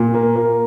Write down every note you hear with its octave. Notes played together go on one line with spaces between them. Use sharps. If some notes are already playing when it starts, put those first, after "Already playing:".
Already playing: A#2
A#3
A#3